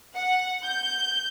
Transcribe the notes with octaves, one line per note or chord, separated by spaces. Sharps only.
F#5
G6